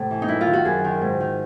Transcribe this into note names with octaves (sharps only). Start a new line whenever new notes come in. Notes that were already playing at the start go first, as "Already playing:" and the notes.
Already playing: A2 C3
E3
D#4
F#2 E4
F4
D#3
F#4
F#2 G#4
D#3
G#2
D#3